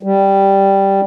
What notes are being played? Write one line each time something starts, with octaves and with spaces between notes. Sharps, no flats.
G3